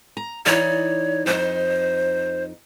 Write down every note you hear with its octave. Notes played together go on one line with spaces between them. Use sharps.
A#5
E3 D#4 C#5 D5
F2 D#4 C5